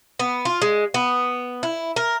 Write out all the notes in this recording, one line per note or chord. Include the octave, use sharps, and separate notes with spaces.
B3
F4
G#3
B3
E4
A#4